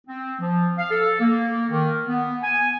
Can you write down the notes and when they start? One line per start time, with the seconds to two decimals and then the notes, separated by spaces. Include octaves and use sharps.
0.07 C4
0.40 F3
0.78 F5
0.91 A4
1.20 A#3
1.69 D#3
2.07 B3
2.43 G#5